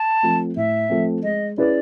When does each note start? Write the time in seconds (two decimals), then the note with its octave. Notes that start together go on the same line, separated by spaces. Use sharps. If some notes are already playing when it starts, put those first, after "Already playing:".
Already playing: A5
0.23 F3 A3 C4
0.57 A2 E5
0.90 F3 A3 C4
1.23 G#3 D#5
1.58 C#4 E4 G#4 B4 D5